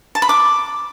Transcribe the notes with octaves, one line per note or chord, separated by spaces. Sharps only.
A5
B5
D6